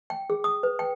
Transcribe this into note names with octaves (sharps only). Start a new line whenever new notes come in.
G5
G#4
D#6
B4
G5